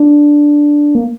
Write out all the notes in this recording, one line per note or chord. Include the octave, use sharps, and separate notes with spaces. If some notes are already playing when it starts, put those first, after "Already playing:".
Already playing: D4
A#3